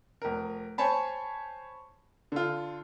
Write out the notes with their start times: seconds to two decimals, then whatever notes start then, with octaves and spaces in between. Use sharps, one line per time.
0.22 F1 A#4
0.78 C5 C#5 G#5 A5 B5
2.32 D3 F4